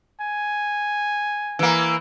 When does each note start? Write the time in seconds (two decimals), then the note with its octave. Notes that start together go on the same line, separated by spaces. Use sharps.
0.20 G#5
1.59 E3 A#3